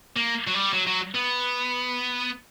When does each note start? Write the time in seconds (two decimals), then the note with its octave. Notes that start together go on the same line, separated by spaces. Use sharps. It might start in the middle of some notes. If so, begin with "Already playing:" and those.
0.17 A#3
0.47 F#3
0.55 G3
0.73 F#3
0.87 F#3
1.15 B3